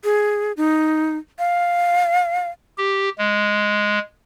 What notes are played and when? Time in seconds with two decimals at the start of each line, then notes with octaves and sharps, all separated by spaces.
0.04 G#4
0.57 D#4
1.39 F5
2.78 G4
3.18 G#3